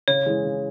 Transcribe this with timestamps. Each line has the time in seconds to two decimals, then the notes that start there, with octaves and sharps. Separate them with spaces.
0.08 C#3 C#5
0.26 E3 G#3
0.44 C#3